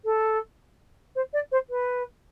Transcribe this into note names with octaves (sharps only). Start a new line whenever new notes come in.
A4
C5
D5
C5
B4